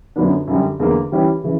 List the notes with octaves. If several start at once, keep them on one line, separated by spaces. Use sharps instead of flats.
F#2 D3 F#3 B3 D4
F#2 D3 G3
E2 D3 A#3
E3 G3 C#4 E4 G4
C#3 E3